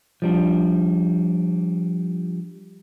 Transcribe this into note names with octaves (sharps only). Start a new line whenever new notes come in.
F3 G3 D4